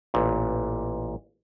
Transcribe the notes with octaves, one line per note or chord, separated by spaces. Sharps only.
A1 A#2